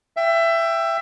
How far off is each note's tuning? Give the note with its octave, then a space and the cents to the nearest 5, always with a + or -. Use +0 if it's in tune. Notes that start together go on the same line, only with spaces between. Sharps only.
E5 +20 G5 +0